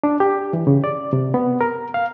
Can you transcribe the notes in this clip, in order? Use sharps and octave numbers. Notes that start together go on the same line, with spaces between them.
D4
G4
E3
C#3
D5
C3
B3
A#4
F5